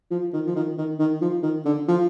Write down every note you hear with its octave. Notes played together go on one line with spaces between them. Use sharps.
F3
D#3
F3
D#3
D#3
D#3
F3
D#3
D3
F3